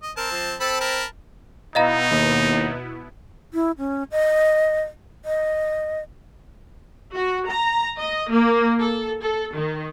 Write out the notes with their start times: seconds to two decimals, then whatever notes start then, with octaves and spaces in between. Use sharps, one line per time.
0.03 D#5
0.17 C4 A#4 A5
0.31 F3
0.60 C4 A4 A5 B5
0.81 A#4 A5 B5
1.75 B2 B3 D#4 E4 D#5 F5 A#5
2.11 D#2
3.54 E4
3.78 C#4
4.11 D#5
5.25 D#5
7.14 F#4
7.47 A#5
7.98 D#5
8.32 A#3
8.80 A4
9.21 A4
9.56 D#3